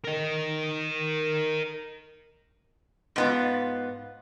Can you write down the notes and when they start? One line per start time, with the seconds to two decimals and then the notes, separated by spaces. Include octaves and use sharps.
0.05 A#4 D#5
3.16 G#2 B3 F4